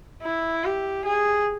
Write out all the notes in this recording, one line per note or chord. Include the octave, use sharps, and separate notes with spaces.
E4
G4
G#4